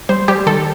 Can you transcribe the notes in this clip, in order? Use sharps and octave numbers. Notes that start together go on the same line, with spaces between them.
G3 C5
G3 G4
D#3 A4